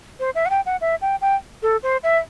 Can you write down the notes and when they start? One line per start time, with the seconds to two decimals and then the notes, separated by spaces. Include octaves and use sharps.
0.20 C5
0.35 E5
0.46 F#5
0.50 G5
0.66 F#5
0.81 E5
1.02 G5
1.21 G5
1.63 A4
1.83 C5
2.03 E5